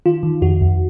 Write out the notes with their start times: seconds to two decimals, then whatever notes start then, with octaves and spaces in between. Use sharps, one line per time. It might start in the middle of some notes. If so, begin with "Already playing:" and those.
0.06 D#3 F4
0.23 D#3
0.42 F2 F#4
0.61 F2